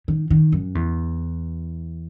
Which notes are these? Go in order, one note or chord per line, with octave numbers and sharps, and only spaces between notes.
D#3
D#3
F#2
E2